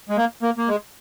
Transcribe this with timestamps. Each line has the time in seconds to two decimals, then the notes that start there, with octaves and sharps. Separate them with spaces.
0.09 G#3
0.17 A#3
0.43 A#3
0.58 A#3
0.68 G#3